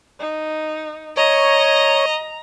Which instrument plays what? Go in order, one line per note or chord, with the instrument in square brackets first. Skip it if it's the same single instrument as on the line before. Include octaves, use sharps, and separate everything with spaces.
[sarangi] D#4
[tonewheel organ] C#5 [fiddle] D#5 [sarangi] A#5